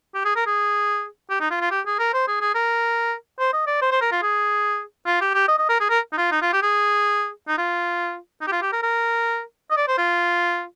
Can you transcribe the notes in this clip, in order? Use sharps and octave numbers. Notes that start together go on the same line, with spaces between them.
G4
G#4
A#4
G#4
G4
D#4
F4
F4
G4
G#4
A#4
C5
G#4
G#4
A#4
C5
D#5
D5
C5
C5
A#4
F4
G#4
F4
G4
G4
D#5
D#5
A#4
G#4
A#4
D#4
F4
D#4
F4
G4
G#4
D#4
F4
D#4
G4
F4
G4
A#4
A#4
D#5
D5
C5
F4